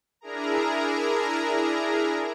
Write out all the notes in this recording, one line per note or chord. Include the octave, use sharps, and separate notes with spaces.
D4 E4 G#4 A#4 A#5